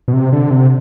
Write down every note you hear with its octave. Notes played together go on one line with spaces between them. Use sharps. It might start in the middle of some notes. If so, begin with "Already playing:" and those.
B2
C3
D3
C3